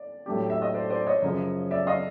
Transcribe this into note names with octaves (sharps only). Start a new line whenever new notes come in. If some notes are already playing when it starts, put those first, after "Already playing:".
Already playing: D5
A2 F#3 A3 D4 G4
E5
D#5
C5 D5
C5 D5
D5
C#5 D#5
F#2 C#3 F3
D5 E5
D#5 F5